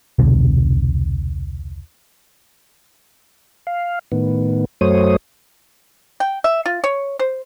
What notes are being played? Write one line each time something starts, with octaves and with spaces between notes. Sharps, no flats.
E1 C2 B2 D3
F5
A2 D#3 B3
F#2 F#3 A3 C5 C#5 D#6
G5
E5
F4
C#5
C5